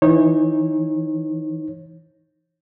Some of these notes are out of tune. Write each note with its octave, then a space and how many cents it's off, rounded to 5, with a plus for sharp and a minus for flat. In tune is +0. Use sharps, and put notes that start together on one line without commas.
E3 +0 D#4 +0 C#5 -30